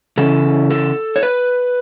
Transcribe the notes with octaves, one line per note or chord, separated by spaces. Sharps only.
C#3 E3 C#4 A4
A4
C#5
B4